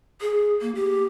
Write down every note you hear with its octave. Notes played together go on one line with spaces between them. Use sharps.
G#4
A#3
G4